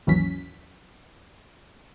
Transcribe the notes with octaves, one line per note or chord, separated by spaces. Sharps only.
G#1 D#2 E3 F#3 C#4 B6